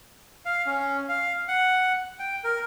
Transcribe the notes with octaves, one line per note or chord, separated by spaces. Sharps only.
F5
C#4
F5
F#5
G5
A#4